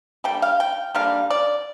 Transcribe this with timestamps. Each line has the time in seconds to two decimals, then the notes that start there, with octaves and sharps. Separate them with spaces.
0.24 D3 G3 A#3 G5
0.42 F5
0.60 G5
0.95 D3 G3 A#3 F5
1.30 D5